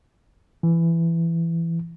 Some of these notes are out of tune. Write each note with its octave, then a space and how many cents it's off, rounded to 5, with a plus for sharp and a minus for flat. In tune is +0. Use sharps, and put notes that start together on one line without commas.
E3 +15